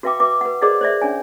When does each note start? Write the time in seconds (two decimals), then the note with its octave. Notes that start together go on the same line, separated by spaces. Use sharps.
0.03 F#4 B4 E5 F5 G5 D6
0.20 B4 E5 D6
0.41 B4 F#5
0.61 G#4 A#4 C5 D5 D#5 F#5
0.81 C5 D5 E5
1.02 C#4 D4 C#5 G#5